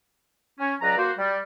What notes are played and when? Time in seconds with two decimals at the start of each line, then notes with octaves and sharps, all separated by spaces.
0.59 C#4
0.81 C#2 F#3 B4 D5 A#5
0.98 A#3 F#4 C5
1.18 G3